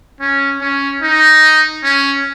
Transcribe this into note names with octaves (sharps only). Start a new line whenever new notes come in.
C#4
C#4
D#4
C#4